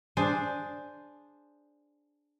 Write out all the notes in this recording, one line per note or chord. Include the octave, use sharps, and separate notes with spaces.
D4 G#4 C5